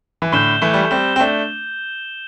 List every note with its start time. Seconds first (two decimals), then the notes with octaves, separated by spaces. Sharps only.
0.22 E3
0.32 A2 D3 G6 E7 G7
0.62 E3 A3
0.74 G3
0.83 A3
0.91 G3 C4
1.16 C4
1.20 A3 D4